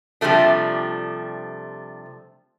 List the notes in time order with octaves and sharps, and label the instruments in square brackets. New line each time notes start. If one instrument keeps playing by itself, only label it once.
[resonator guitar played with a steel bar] C3 F3 G3 A3 D4